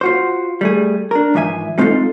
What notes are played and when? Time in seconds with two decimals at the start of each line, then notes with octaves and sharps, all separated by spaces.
0.01 F4 F#4 C5
0.61 G3 A3 G#4
1.11 D4 A#4
1.34 G#2 E3 F3 E5 G#5
1.78 G3 G#3 C4 D#4 F4 A4